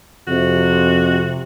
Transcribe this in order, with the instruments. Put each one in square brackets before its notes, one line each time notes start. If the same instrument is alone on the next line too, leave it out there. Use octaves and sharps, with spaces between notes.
[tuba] F2 [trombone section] C3 [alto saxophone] F#4